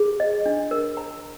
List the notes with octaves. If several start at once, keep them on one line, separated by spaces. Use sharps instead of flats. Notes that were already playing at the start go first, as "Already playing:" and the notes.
Already playing: G#4
D#5
D4
A#4
A#5